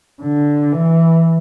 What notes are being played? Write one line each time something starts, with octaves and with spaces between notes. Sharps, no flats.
D3
E3